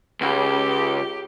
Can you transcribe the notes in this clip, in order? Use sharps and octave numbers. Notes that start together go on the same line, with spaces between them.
C#2 G4